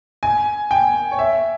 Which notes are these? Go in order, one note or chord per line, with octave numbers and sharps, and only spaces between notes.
G#5
G5
C#5
E5